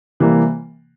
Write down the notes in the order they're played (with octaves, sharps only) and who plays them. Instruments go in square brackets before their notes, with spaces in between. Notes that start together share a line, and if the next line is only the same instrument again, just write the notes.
[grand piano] C3 E3 G3 A#3